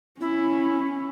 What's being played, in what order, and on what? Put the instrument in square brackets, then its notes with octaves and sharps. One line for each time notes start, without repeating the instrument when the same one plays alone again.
[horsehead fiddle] C#4 [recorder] E4